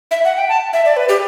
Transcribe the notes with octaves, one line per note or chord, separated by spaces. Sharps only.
E5
F#5
G5
A5
E5
D5
B4
G4